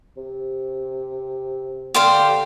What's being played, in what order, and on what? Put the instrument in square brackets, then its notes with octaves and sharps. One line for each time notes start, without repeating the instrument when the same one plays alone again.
[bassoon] C3
[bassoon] D3 [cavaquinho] G4 C5 F5